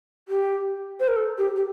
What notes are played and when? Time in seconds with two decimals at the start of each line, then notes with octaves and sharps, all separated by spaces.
0.28 G4
1.00 C5
1.08 A#4
1.16 A4
1.38 G4
1.56 G4